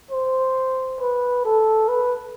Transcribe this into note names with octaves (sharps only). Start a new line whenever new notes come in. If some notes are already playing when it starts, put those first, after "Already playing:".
C5
B4
A4
B4